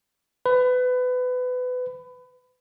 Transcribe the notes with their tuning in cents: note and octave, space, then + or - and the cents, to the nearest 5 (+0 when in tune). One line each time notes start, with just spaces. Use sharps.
B4 +25